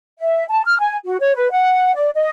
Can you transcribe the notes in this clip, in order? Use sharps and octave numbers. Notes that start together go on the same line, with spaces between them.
E5
A5
F6
G#5
F#4
C#5
B4
F#5
D5
D#5